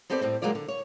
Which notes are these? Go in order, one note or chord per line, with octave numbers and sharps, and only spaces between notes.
B3 C4 G4 A4 C5 D5
A2 G3 C4
C#3 F#3 G#3 A#3 F4 D5
D3
C#5